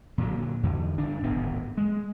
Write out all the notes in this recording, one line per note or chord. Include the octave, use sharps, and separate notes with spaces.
A#2 D3 E3 F#3
E2 D3
G1 D4
D1 G#1 C3 B3
G#3